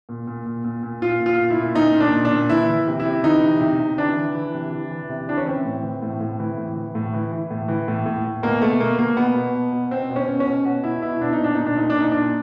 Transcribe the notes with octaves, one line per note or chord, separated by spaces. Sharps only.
A#2
A#2
A#2
A#2
A#2
A#2 F4
A#2
F4
A#2
E4
A#2
A#2 D#4
A#2
D4
A#2
D4
A#2
E3 E4
E3
C3
E4
C3
E3 D#4
C3
C3
C3
E3 D4
E3
E3
C3
E3
E3
C3
E3 D4
C#4
E3 C4
A2
E3
A2
A2
E3
A2
E3
A2
E3
E3
A2
E3
A2
A2
A2
B2 A#3
B2 A3
B2 A#3
B2 A#3
B2 B3
B2
B2
B2
B2 C4
B2
C#4
B2
C#4
B2
B2 F#4
B2 E4
B2 E4
B2 D4
D#4
A#2 D4
A#2 D#4
D4
A#2 D#4
D4
A#2
D#4
A#2 D4